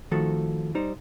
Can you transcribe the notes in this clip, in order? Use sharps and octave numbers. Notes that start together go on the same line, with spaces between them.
D#3 F3 A3 F#4 A4
G3 D#4 C5